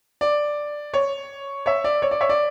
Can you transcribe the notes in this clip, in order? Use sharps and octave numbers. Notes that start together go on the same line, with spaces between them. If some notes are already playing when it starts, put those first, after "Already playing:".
D5
C#5
C#5 E5
D5
C#5
D5
C#5 E5
D5